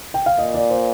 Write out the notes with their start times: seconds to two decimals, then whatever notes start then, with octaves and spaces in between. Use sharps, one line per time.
0.14 G5
0.26 F5
0.38 A#2 D#5
0.54 D5
0.70 C5